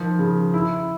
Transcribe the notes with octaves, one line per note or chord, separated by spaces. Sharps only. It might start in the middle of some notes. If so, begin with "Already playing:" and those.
Already playing: D#3 F3
C#3
E4